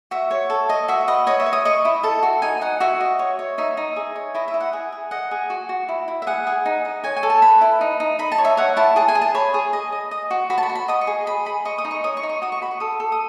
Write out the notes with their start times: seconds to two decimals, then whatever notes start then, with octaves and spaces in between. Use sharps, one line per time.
0.11 F#4 E5
0.31 C#5
0.50 A4
0.69 D#5
0.88 F#4 E5
1.07 B4 D#5
1.27 C#5 D#5
1.40 E5
1.46 C#5
1.53 D#6
1.65 D#5 C#6
1.85 E4
2.03 A4 A5
2.23 F#4
2.42 D#4 G#5
2.61 D#4 F#5
2.80 F#4 E5
3.00 D#5
3.19 C#5
3.39 C#5
3.58 D#4 E5
3.77 D#4
3.96 G#4
4.16 C#5
4.35 E4 D#5
4.48 E5
4.54 E4
4.60 F#5
4.73 G#4
4.92 G#4
5.11 D#5 F#5
5.31 G#4
5.50 F#4
5.69 F#4
5.89 E4
6.08 E4
6.22 E5
6.27 G#4 F#5
6.47 G#4
6.66 D#4
6.85 D#5
7.04 C#5 G#5
7.17 G#5
7.23 A4
7.30 A5
7.42 B4 B5
7.61 E4
7.81 D#4
8.00 D#4
8.19 D#4 B5
8.32 A5
8.38 C#5
8.45 E5
8.57 C#5 F#5
8.77 E4 A5
8.96 G#4 A5
9.08 G#5
9.15 G#4
9.21 A5
9.35 C#5 B5
9.54 G#4
9.73 D#5
9.92 D#5
10.11 D#5
10.31 F#4
10.50 F#4 B5
10.58 A5
10.63 B5
10.69 F#4
10.75 B5
10.88 D#5 D#6
11.01 C#6
11.07 G#4
11.27 G#4 B5
11.46 G#4 B5
11.65 D#5 C#6
11.78 D#6
11.85 D#4
11.91 C#6
12.04 C#5 D#6
12.17 C#6
12.23 D#4
12.29 C#6
12.42 F#4 D#6
12.52 C#6
12.61 F#4 B5
12.71 C#6
12.80 A4 D#6
13.00 A4
13.12 D#6